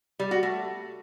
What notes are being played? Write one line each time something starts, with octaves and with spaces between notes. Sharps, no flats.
G3
F#4
A3